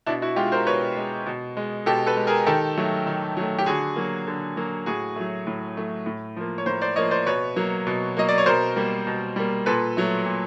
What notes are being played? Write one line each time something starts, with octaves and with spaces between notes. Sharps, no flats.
B2 D4 E4
E4 F#4
G#3 F4 G4
A#4 C5
B2 B4 C#5
G#3
B2
G#3
B2 G4 A4
A4 B4
G#3
G#4 A#4
D#3 G4 A4
F#3 A3
D#3
F#3 A3
G4
D3 F#4 G#4
F#3 A#3
D3
F#3 A#3
A2 F#4 G#4
F#3 A3
A2
F#3 A3
A2
F3 A#3
C#5
A2 A#4 C5
C5 D5
F3 A#3 C#5 D#5
C5 D5
B2 B4 C#5
F#3 A#3
B2
F#3 A#3 D#5
D5
C#5
B2 A#4 C5
G3 A#3
B2
G3 A#3
A#2 A4 B4
F#3 A3
A#2